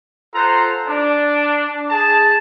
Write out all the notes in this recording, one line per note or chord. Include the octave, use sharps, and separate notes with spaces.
F4 A4 C5 F#5 A#5
D4
G#4 A5